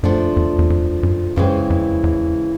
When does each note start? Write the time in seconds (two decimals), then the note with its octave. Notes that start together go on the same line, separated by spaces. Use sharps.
0.03 F#2 F3 A3 D4
0.37 E2
0.59 E2
0.70 F2
1.03 F#2
1.36 F#2 C#3 E3 G#3 C4
1.70 F2
2.04 E2